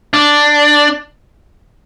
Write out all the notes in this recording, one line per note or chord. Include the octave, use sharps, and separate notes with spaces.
D4